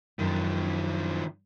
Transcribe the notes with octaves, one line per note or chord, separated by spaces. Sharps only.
F#2 D#3 F3